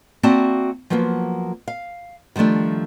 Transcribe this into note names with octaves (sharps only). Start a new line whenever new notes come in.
A#3 C4 F#4 D5 E5 A5
F3 F#3 A#3 B3 F4
F5
D#3 F3 G3 A3 D4